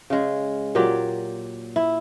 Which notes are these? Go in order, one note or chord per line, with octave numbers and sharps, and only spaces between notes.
C#3 G#3
A#2 F#3 G4 D5
E4